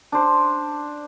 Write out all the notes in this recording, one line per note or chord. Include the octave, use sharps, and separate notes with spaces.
D4 C5